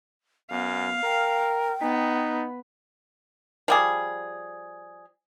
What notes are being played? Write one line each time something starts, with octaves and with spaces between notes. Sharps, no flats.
F#2 B3 F5
A#4 G5
B3 D#4
F3 G3 G#4